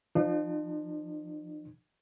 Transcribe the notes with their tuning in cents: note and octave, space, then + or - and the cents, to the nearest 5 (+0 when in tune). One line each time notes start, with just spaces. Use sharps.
F3 +0 D#4 -45